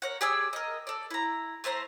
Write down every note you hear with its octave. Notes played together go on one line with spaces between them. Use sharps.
A#4 C#5 F#5
G4 G#4 D5 E6
A#4 D#5
A4 D5
E4 A#5
A3 E4 C5 A#5